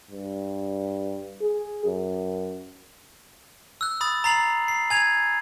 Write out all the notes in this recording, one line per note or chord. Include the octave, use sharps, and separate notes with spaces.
G2
G#4
F#2
E6 F#6
B5 D#6 A6
A#5 A6 C7 F7 F#7
C7
G#5 G#6 F7